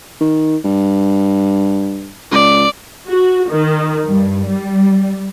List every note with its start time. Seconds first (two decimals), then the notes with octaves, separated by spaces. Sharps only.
0.21 D#3
0.64 G2
2.32 C#2 D5
3.07 F#4
3.50 D#3
4.05 G2
4.48 G3